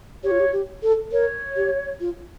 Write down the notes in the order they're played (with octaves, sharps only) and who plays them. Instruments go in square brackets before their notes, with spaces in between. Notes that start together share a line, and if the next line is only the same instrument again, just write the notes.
[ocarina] G4 [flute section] C#5
[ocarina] F4
G4
G4
A4
[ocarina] A#4 [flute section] C#5
[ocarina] G4
F4